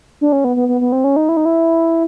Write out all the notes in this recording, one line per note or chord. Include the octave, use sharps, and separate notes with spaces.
D4
C#4
B3
B3
B3
B3
C4
C#4
D#4
E4
D#4
E4